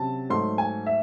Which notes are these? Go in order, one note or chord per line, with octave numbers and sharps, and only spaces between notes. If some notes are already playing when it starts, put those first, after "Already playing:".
Already playing: C3 F#3 C#4 A5
G#2 F#3 A3 C6
G#5
E5